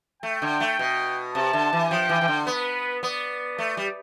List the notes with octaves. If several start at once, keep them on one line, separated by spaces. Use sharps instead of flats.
A3 G5
D3
A3
B2
C3 A5
D3
E3
F3 G5
E3
E3
D3
B3 B4
B3 D5
A3
G3